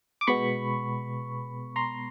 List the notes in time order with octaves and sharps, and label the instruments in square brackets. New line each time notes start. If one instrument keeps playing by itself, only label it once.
[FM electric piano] D6
B2 G#3 B3 B5 C#6
A#5 C6